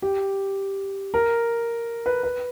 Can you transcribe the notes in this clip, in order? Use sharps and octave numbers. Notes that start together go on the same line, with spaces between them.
G4
A#4
B4
B4